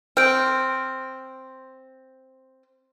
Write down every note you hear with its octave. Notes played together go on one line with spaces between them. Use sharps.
C4 F6 G6 D7